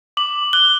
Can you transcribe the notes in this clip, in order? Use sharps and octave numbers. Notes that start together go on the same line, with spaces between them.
D6 F#7
F#6 G7